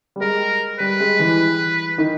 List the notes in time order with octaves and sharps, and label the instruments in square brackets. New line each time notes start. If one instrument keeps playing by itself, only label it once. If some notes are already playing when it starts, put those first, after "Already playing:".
[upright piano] G3
[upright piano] G#3 [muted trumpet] A#4
[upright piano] G3 [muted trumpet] B4
[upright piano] G#3
E3
D#3